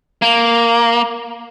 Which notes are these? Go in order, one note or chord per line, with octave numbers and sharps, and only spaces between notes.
A#3